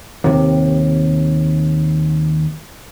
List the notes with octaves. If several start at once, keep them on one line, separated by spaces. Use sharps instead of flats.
D#2 C3